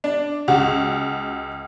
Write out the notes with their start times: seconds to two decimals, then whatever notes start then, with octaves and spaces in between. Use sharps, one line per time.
0.04 D4
0.48 C#2 F#4